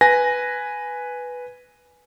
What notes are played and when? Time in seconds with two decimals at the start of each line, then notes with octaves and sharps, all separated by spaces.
0.01 B4 G#5 A#6